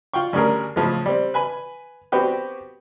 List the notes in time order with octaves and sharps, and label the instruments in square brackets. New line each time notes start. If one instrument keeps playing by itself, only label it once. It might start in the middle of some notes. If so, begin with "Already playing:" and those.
[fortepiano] F4 F#5 G5 C#6
D2 G3 C#4 G#4 A#4
A2 C#3 F3 G#3
G3 C4
B4 G#5 B5
B3 C4 F#4 G4 B4